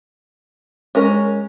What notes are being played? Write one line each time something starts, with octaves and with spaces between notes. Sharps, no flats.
G#3 C#4 A#4